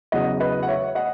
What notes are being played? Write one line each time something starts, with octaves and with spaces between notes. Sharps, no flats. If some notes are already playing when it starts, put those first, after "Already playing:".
E2 C#3 F#3 D#5 F#5
B4 D#5
F#5
C#5 E5
D#5 F#5